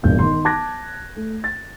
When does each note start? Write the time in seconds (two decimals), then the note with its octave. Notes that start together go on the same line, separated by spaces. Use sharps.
0.03 E1 G2 A#2 G6
0.19 D#3 D#4 C6
0.45 A5 D6 F#6 G#6 A#6
1.16 A3
1.44 A6